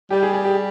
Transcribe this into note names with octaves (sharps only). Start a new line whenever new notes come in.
G3 G4
G#4
G#4
G4